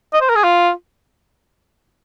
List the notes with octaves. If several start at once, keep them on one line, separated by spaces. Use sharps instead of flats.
D#5
C5
A#4
G#4
F4